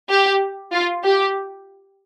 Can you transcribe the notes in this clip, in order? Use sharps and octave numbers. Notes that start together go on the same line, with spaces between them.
G4
F4
G4